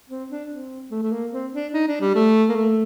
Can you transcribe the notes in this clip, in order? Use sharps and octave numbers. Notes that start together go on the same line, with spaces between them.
C4
D4
C4
A3
A3
A#3
C4
D4
D#4
D4
G3
A3
A#3
A3